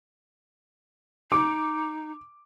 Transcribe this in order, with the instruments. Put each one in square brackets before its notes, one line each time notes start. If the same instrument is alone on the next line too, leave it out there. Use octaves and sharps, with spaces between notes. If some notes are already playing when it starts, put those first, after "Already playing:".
[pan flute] D#4 [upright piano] D6